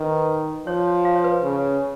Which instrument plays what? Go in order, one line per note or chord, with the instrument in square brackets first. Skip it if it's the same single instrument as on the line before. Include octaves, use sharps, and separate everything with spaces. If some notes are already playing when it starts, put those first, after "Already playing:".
Already playing: [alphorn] D#3 [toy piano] B4
[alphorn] F3 [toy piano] C#5
[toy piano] F5
C#5
B4
[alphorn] C#3